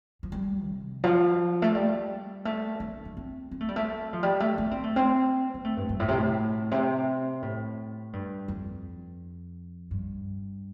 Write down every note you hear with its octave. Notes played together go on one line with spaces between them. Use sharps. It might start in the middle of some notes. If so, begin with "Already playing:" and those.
F3
G3
C3
F3
A3
G3
A3
D4
D4
C4
C4
A3
G3
A3
F3
G3
A3
D4
C4
A3
C4
C4
A3
G2
G2
A2
C3
A2
C3
A2
G2
F2
G2